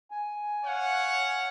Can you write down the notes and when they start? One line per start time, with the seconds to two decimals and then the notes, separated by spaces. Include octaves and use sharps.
0.11 G#5
0.64 C#5 F5 F#5